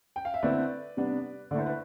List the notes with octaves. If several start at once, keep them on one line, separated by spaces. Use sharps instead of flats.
G5
F5
E5
D3 A3 C4 E4 B4 D5
C3 G3 B3 D4
D3 A3 E4 C5 D5
B4